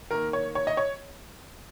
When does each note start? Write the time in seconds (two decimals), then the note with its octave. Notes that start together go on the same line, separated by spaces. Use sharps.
0.11 D#3 A#3 A#4
0.33 C#5
0.55 C#5
0.67 D#5
0.77 C#5